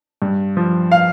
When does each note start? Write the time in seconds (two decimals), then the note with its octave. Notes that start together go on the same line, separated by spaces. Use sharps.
0.22 G2
0.57 F3
0.92 F5